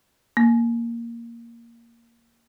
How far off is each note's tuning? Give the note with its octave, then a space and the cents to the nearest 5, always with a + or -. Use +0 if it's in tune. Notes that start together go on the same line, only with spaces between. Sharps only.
A#3 +0